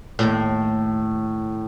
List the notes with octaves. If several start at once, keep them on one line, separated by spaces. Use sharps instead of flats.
D#2 A2